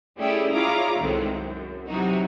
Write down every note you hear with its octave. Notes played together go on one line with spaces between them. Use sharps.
G3 A3 C#4 E4 G4 G#4
E4 F4 G#4 C#5 A#5 D6
C2 A2 D#3 G#3 C4
F#2
C3 E3 F#3 D#4 F#4